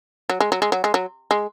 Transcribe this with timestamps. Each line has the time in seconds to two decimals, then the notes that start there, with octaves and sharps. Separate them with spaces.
0.29 F#3
0.40 G#3
0.52 F#3
0.62 G#3
0.72 F#3
0.84 G#3
0.94 F#3
1.31 G#3